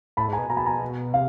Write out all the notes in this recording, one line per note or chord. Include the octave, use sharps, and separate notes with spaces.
A2 A5 B5
G#2
G#5 A#5
B2
B2 G#5 A#5
A5 B5
G#5 A#5
C3 F5